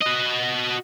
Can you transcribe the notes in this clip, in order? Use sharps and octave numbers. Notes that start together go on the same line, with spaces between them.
F#4 D#5